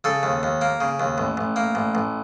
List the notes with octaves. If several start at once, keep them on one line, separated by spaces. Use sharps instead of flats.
C#3 A4
D#2
D#2
A#3
C#3
D#2
A1
A1
A#3
A1
A1